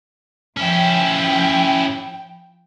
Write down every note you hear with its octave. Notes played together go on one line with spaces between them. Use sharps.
F3 C#4 E4 G5